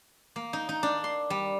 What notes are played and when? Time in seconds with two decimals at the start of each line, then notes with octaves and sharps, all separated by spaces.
0.36 A#3
0.53 D#4
0.69 D#4
0.83 D4
1.04 C6
1.30 G3